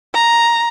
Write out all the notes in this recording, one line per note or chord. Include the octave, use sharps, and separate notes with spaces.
A#5